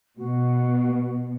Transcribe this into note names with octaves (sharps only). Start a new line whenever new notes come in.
B2 F#4